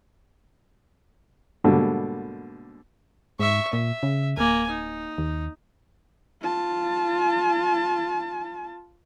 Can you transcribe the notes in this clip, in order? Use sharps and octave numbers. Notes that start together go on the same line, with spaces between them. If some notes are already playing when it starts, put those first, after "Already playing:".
G#2 B2 D3 G3 A#3
G#2 E5 C#6
A#2 E5
C#3
D1 A#3 G#5
D#4
D#2
F4 A5